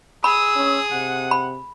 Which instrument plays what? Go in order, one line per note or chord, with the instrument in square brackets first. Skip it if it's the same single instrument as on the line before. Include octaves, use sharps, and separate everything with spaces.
[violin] G#4 D#6 [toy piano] B5 [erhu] E6
[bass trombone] C#4
[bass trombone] C3 [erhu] F#5
[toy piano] B5